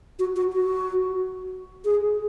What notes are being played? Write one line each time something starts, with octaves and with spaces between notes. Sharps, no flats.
F#4
F#4
F#4
G#4